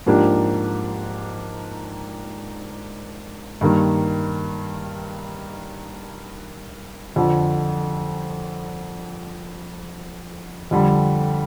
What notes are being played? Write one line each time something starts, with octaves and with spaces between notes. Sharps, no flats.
G#2 F3 A#3 D4 G4
G2 D#3 A#3
F2 D3 F3
F2 D3 G3